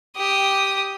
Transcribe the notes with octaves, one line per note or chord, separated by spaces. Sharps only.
G4 D#6